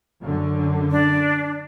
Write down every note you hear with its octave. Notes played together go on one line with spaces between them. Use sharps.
F#2 D3
D4